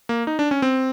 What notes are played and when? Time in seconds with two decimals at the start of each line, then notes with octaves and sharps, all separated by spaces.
0.09 A#3
0.27 D#4
0.39 D4
0.51 C#4
0.62 C4